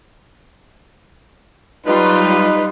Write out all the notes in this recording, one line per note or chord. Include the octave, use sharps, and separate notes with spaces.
F#3 G3 D#4 F4 B4